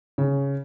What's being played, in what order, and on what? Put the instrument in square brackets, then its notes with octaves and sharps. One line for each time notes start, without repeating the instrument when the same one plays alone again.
[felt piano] C#3